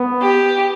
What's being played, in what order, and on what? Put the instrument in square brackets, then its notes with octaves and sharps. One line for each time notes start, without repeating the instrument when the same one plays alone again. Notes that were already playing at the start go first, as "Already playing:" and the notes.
Already playing: [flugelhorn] B3
[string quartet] G4